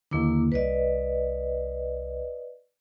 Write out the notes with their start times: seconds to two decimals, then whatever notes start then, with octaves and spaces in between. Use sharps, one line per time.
0.11 D#2 D3 A#3 E4 D6
0.52 C2 B4 D5 D#5